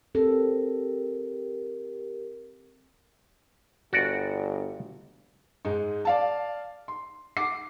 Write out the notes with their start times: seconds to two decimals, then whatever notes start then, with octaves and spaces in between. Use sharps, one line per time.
0.15 C4 G4 A4 A#4
3.93 G1 F#4 D5
5.65 G#2 G#3 D#4
6.05 D5 F5 A5
6.88 C6
7.37 F#5 D6 C7